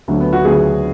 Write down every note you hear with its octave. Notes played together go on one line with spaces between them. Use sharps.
D2 D3 F#3
B3
F#4
D2 D3 F#3 G#4